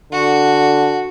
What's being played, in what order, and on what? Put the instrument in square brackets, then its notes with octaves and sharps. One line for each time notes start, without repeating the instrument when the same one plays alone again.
[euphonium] D3 [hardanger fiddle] F#4